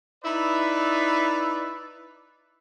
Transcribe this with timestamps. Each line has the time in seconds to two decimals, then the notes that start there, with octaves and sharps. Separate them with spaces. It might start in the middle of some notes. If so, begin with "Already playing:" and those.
0.24 D#4 E4 B4 D5